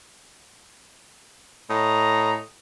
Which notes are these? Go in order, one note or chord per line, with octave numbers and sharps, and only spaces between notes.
A2 D#5 A#5